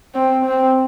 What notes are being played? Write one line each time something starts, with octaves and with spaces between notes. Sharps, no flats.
C4
C4